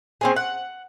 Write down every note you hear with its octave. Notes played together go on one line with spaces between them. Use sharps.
C4 C#4 G#4
F#5